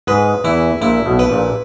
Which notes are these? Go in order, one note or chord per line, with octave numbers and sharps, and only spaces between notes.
G#2 G#3 B4
E2 E3 E4
A#1 A#2 E4
B1 B2
B4
A#1 A#2